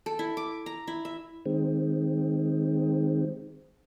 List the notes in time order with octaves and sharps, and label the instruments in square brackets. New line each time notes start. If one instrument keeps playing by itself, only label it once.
[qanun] A4
E4
D6
A#5
E4
E5
[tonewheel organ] D#3 G#3 C4